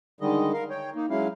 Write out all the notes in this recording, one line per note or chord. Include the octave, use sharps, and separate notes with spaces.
D3 D#3 G3 G#3 D#5
A#4 F5
C#5 G5
A#3 D#4
F#3 G#3 C#4 E4 F5